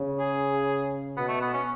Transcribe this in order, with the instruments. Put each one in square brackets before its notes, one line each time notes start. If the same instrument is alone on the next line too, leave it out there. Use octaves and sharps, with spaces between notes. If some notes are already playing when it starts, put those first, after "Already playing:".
Already playing: [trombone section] C#3
[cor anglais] G#4
[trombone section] B2 [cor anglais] B3
[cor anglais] A3
B3
C#4